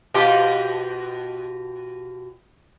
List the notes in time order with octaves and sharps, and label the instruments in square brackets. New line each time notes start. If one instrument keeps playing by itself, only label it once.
[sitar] B2 F4 G4